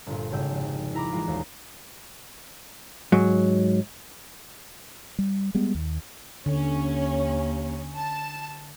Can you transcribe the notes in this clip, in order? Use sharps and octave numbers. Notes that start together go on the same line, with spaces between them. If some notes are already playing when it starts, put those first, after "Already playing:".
G1 A#2
G#1 C#3 G5 E6
F1
E4 A#5 B5 D6
E3 G#3 F4
E1 D#2
G#2 F#3
G3
G3 G#3 B3
D#2
D#2 D3 C#4
A5